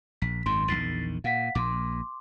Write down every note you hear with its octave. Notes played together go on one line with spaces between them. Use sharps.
A#1 B6
G#1 F#2 D#3 C6
A#1 E2 D#3 A6 B6 C7
A#2 F5 F#5 B6
A#1 A#2 C6 D6